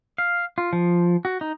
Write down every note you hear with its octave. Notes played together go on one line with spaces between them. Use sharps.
F5
F4
F3
F#4
D#4